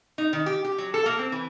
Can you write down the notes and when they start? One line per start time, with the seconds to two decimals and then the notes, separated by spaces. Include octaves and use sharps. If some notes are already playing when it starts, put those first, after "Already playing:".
0.18 D#4
0.33 D#3
0.46 G4
0.64 G4
0.78 F#3
0.94 A4
1.06 A#3
1.19 C4
1.32 E3